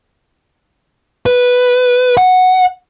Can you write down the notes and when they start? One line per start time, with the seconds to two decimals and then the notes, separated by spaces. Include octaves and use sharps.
1.26 B4
2.17 F#5